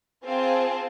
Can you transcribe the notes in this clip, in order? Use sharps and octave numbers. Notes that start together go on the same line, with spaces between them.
C4 F4 G#4 F5 G#5 A5